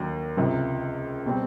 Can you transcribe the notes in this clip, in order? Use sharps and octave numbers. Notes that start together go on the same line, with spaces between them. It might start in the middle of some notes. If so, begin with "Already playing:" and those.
Already playing: D#2 D3 F#3
C#2 C3 F3
B2 G3 C4